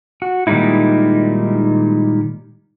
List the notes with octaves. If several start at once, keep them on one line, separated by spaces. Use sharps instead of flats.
F#4
A#2 D#3 G3 G#3 D#4 E4